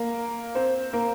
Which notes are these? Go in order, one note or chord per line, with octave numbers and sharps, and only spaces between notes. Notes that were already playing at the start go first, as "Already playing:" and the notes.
Already playing: A#3 A#4
C4 C5
A#3 A#4